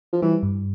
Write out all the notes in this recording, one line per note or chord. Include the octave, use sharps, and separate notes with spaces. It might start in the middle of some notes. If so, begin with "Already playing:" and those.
F3
E3 G3
G2